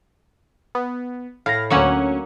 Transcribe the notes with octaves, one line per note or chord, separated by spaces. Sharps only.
B3
A2 F5 A#6
D2 F#3 A#3 C#4 F#5 C#6